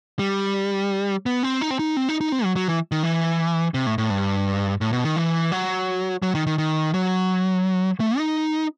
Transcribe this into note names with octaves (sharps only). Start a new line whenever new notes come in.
G3
B3
C4
D#4
C4
D#4
C4
D#4
D#4
C4
F#3
F#3
E3
D#3
E3
C3
A2
A2
G2
A2
B2
D#3
E3
F#3
F#3
D#3
D#3
D#3
F#3
A3
D#4